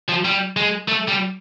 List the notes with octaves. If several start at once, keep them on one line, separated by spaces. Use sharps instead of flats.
F3
G3
G#3
A3
G3